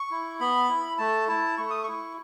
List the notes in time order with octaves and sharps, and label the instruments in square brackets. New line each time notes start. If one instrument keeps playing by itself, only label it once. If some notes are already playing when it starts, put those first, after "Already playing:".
Already playing: [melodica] C#6
E4
B3 B5
E4
A3 A5
E4 A5
A3 C#6
D#6
E4 C#6